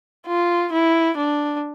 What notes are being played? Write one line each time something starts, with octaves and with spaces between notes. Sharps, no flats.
F4
E4
D4